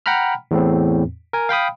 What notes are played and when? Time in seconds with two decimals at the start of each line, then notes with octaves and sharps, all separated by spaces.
0.06 F#5 G5 A#5 B5 F6
0.51 E2 A2 C4
1.33 A#4 G#5
1.49 F5 G5 B5 D#6